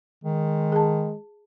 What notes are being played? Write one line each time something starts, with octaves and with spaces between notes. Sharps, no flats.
D#3 G#3
G#4 A5